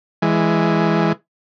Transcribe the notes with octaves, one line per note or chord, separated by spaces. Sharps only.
E3 G#3